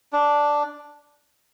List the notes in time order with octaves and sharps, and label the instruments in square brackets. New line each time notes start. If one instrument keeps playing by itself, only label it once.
[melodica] D4